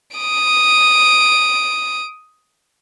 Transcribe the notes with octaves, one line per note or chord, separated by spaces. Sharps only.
D#6 D7